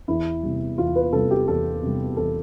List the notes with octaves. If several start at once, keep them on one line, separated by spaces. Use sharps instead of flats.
E2 E4
C3 G3
E2 F4
B4
C3 G3 A4
G4
E2 A4
C3 G3
E2 A4